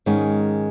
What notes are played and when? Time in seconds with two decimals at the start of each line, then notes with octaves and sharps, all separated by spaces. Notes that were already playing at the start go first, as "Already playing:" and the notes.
0.06 G#2 D#3 G#3 C#4